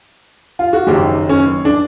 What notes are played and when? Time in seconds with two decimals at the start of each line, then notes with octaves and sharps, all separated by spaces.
0.59 F4
0.73 F#4
0.87 F#1 F#2 D#3 G4
1.29 C#4
1.65 D4